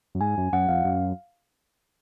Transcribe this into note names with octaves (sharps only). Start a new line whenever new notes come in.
F#2
G#2 G#5
F#2
F#2 F#5
F2 F5
F#2